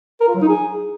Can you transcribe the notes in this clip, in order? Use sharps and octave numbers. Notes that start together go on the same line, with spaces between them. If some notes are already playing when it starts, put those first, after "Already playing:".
A#4
F4
F#3
D#4
G#4